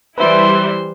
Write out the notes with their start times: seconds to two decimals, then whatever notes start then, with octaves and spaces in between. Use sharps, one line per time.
0.18 E3 G3 E4 B4 C5 E5 C6